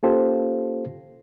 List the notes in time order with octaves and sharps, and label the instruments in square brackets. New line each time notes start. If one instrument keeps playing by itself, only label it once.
[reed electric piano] A#3 C#4 F4 G4 A4 C5